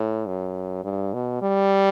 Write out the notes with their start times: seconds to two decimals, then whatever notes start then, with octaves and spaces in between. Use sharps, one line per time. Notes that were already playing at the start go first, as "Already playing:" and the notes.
Already playing: A2
0.27 F#2
0.84 G2
1.14 B2
1.42 G3